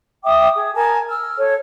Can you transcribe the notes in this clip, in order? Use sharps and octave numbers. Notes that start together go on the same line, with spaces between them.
E5 G5 D6 D#6
G#4
A#4 G#5 A5
E6 F6
A4 C#5